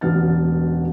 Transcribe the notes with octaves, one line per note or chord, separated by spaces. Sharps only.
E1 A1 B3 F#4 F6 A6